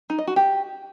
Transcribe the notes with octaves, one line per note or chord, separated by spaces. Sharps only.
D#4
D#5
F#4
G4